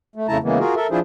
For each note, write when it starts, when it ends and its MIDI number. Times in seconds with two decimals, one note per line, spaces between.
0.16 0.27 57
0.28 0.37 41
0.28 0.37 49
0.28 0.37 57
0.28 0.37 64
0.28 0.37 81
0.28 0.37 82
0.43 0.59 49
0.43 0.59 52
0.43 0.59 56
0.43 0.59 58
0.43 0.59 59
0.59 0.75 65
0.59 0.75 66
0.59 0.75 68
0.59 0.75 70
0.76 0.87 69
0.76 0.87 70
0.76 0.87 76
0.91 0.99 53
0.91 0.99 62
0.91 0.99 64
0.91 0.99 65
0.91 0.99 68
0.91 0.99 72